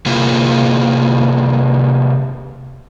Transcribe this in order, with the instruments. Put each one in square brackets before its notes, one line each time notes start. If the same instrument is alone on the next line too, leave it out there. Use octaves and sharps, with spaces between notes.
[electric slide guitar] C3 A#3 E4 F4 G#4